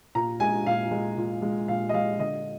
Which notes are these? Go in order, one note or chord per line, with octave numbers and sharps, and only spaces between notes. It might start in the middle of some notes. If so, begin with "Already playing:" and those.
A#2 A#5
G#3 G#5
A#2 F5
G#3
A#2
G#3
A#2 F5
D#5
G#3 F5
D3 D#5